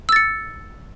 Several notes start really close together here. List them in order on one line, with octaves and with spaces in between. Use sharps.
E6 A6 C#7